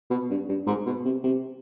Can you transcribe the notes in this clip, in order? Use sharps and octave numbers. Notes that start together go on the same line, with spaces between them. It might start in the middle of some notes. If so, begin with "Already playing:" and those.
B2
G2
G2
G#2
B2
C3
C3